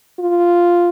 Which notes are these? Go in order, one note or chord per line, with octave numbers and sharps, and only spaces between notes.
F4